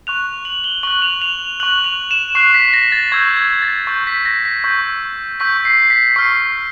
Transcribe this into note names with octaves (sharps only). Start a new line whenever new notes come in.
C#6 F#6 F7
F#7
G7
C#6 F#6 F#7
F7
F7
C#6 F#6 F#7
F7
E7
C#6 F#6 C7
B6
A#6
A6
C#6 E6 G6 G#6
G#6
A6
C#6 E6 G6
B6
A#6
B6
C#6 E6 G6
C#6 E6 G6 B6
C7
B6
C#6 F6 C7